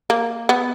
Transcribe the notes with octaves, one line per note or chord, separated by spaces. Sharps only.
A#3
B3